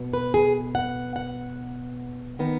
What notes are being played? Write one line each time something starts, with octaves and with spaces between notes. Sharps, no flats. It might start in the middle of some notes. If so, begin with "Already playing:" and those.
Already playing: B2 B3
B4
G#4
F#5
F#5
D#3 B3